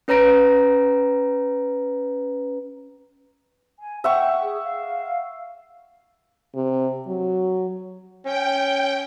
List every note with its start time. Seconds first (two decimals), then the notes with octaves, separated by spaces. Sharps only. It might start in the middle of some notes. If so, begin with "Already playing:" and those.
0.08 C#4 B4 C#5 A#5 A#6 D7
3.79 G#5
4.04 E5 F#5 G5 C#6
4.41 G#4
4.63 F5
6.55 C3
7.07 F#3
8.26 C#4 G5